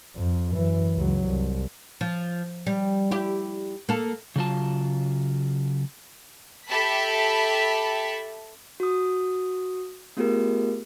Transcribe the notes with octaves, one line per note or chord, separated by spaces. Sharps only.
F2
F#2 E3
C#2 F#3
C2
F3
G3
E4 G4
A#3 A4
C#3 F#3 F4 A5
G4 A4 E5 A5 B5 B6
F#4 D#6
A3 B3 F4 G4 G#4 A#4